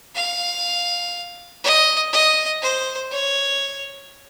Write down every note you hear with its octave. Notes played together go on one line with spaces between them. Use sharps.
F5
D#5
D#5
C5
C#5